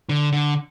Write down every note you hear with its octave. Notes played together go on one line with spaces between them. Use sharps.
D3
D3